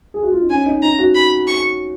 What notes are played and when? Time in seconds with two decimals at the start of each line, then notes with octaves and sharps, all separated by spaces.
0.14 G#4
0.23 F#4
0.32 F4
0.41 D#4
0.50 C#4 G#5
0.66 D#4
0.82 D#4 A#5
0.99 F#4
1.15 B5
1.47 C#6